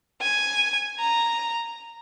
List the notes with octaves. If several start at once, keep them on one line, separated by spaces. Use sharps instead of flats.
G#5
A#5